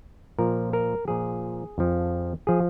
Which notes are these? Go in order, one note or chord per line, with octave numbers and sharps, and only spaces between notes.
A#2 F3 A#4
A#4
A#2 F3 G#4
F2 F3
F3 G#4